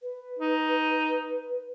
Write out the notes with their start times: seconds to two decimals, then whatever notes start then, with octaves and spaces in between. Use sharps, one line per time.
0.01 B4
0.39 D#4